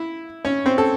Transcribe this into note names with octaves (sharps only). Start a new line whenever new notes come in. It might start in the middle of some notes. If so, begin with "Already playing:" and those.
Already playing: E4 E5
C#4 C#5
C4 C5
A4